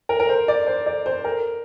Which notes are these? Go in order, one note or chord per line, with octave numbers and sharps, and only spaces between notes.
A#4
A#4
C5
D5
C5
D5
C5
A#4